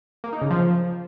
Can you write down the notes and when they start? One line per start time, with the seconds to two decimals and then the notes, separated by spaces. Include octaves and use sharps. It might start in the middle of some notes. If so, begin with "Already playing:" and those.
0.24 A#3
0.33 D#4
0.42 C#3
0.50 F3